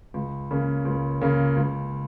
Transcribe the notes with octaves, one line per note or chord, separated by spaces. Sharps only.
C#2
C#3 A#3 C#4
C#2
C#3 A#3 C#4
C#2